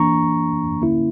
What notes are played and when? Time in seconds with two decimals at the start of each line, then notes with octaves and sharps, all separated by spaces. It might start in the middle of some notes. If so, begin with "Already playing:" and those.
Already playing: E3 A#3 D4 A#5 C#6
0.82 D3 A#3 C#4 E4